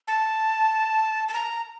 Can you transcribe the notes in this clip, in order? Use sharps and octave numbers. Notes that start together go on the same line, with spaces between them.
A5
A5
A#5